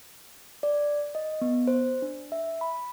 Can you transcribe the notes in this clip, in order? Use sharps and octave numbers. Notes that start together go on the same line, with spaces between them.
D5
D#5
B3
C5
D4
E5
B5